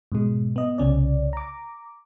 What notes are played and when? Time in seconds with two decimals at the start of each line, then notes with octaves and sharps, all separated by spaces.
0.12 G#2 B2 G#3
0.56 B3 D#5
0.78 C2 C#3 C#4 D5
1.33 A#5 D6